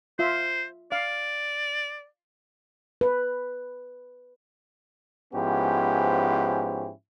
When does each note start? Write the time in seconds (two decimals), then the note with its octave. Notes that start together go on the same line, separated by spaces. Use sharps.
0.19 F4 C5 E5
0.92 D5 F5
3.01 B4
5.34 G#2 F3 B3 C#4 E4 G4